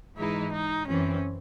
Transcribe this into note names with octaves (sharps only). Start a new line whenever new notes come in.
G#2 E3 G#3 D#4 E4
D#4
F#2 E3 C4 C#4